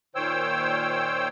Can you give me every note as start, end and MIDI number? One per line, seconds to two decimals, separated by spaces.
0.15 1.28 46
0.15 1.28 51
0.15 1.28 72
0.15 1.28 73
0.15 1.28 79
0.15 1.28 88